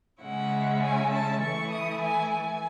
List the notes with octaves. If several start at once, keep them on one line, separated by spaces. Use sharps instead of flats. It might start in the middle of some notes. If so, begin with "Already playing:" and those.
C#3 G#3 C#4 E4 F#5
G#5
A5
E3 A3 E4 C#6
D#6
G#5
G#5